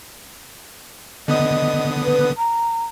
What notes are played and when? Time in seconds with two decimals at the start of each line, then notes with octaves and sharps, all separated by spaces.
1.28 D3 B3 D#5 D#6
2.05 B4
2.38 A#5